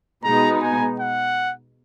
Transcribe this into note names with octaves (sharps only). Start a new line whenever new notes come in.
B2 G#3 B3 D#4 A#5
G#5
F#5